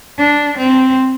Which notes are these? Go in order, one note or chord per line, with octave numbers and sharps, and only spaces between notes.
D4
C4